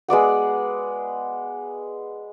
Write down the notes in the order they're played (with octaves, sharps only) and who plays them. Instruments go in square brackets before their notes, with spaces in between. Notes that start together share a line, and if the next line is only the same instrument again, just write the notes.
[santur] G#3 B3 D5 F#5